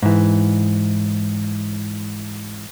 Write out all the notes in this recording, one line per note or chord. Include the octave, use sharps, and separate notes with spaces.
G#2 E3